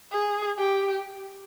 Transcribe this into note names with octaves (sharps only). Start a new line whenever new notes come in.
G#4
G4